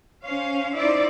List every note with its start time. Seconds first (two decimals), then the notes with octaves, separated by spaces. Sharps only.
0.24 C#4 C5 F5
0.76 D#4 E4 C5 D5